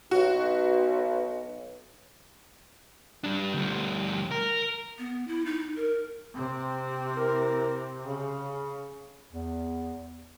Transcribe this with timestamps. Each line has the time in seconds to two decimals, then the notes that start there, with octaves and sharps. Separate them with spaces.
0.11 B1 F#4
3.24 G3 D4
3.53 D2 G3
4.31 A#4
4.99 B3
5.28 E4
5.46 D#4
5.76 A#4
6.34 C3 C4
7.14 E4 A#4
8.05 C#3
9.32 E2